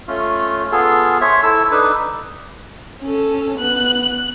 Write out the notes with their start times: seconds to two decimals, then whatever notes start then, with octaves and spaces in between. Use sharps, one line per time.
0.08 A3 C#4 F4
0.72 B3 F4 G#4 A4
1.21 C5 C#5 E5
1.43 E4 A4 E6
1.72 D4 D#4 A4 B4
3.02 C#4 A4
3.58 B3 F#6